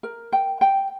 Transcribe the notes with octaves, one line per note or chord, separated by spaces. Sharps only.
A#4
G5
G5